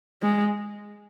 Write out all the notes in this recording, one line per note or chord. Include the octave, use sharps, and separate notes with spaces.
G#3